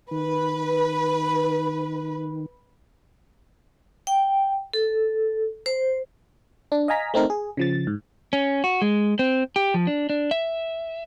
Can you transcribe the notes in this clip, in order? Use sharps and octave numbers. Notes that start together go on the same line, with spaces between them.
D#3 B4
G5
A4
C5
D4
D#5 F5 G#5 A#5 B6
A3 C4 D#4 A#4
G#4
C#3 F3 A6
G#2
C#4
F#4
G#3
C4
G4
F3
D4
D4
E5